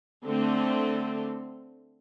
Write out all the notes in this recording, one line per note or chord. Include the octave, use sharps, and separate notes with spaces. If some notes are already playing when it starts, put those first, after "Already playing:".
D3 A3 C4 A4